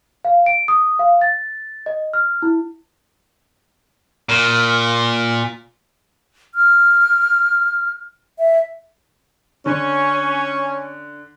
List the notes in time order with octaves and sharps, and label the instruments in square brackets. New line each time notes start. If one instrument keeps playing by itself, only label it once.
[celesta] F5
D7
D#6
F5
A6
D#5
F6
E4
[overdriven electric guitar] A#2
[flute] F6
E5
[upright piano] D3 [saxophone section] C#4